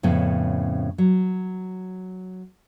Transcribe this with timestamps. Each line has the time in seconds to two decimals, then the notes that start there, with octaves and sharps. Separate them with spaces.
0.03 F2 A2 C#3 B3
0.98 F#3